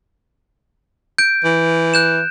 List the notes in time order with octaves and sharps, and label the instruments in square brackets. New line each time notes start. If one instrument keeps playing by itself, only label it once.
[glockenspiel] G6 D7
[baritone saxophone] E3
[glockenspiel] F#6 G6 E7